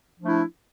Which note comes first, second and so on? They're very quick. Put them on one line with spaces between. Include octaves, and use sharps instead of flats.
F3 D4 A3 E4